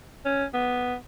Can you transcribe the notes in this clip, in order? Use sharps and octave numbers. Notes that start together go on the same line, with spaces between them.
C#4
B3